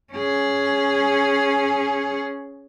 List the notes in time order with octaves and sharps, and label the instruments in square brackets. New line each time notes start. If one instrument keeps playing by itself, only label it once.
[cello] C#4 G#4